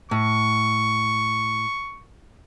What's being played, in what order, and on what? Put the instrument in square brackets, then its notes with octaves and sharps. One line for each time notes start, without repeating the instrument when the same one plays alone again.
[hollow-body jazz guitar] A2 [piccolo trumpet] C#6